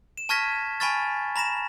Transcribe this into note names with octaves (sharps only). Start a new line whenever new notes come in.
E7
A5 C#6 F6 G#6 A#6 B6
G#5 A5 B5 C#6 F6 A6
A#5 B5 A#6 E7